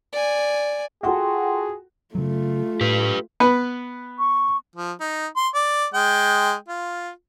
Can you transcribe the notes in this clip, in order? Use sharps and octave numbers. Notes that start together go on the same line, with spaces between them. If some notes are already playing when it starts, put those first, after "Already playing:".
D5 G#5
F4 F#4 G#4 A4 G5 C6
C#3 F#3 A3 F4
A2 G4 B4
B3 B4
C#6
F3
D#4
C6
D5
G#3 G5
F4